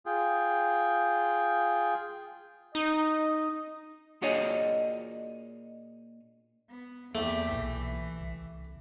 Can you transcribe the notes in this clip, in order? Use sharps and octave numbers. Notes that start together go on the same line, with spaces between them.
F4 G#4 G5
D#4 D#5
A#2 D4 F#4 G#4 C#5 D#5
B3
E2 A3 A#3 G4
B1 A#2 E3
C2